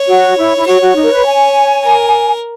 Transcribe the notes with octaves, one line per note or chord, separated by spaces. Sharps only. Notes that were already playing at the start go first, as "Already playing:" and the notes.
Already playing: C#5
F#4
E4
E4
F#4 C#5
F#4
D#4
A#4
B4
G#5
A#4